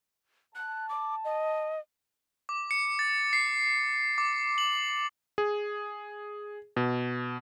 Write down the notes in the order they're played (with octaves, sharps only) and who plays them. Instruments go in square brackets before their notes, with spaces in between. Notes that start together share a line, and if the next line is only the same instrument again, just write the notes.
[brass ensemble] A5 [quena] F#6
[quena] D6
D#5
[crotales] D6
C#7
A6
C7
D6
F#7
[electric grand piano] G#4
B2